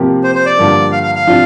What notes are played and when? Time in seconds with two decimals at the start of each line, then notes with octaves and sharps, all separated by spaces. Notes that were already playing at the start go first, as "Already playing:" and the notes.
Already playing: C3 F3 A#3 G4
0.24 C5
0.35 C5
0.46 D5
0.57 G2 D3 F3 A#3 D4
0.92 F5
1.03 F5
1.15 F5
1.27 C3 F3 D4 F4